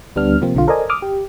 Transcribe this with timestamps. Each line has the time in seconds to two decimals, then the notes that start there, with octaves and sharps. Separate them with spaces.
0.16 D2 G3 B3 D4 F6
0.42 C3 F3 A#3 C4
0.54 B1 D3 F4
0.68 A4 A#4 C5 D5 D#5 G#5
0.90 D6 D#6 F6
1.02 G4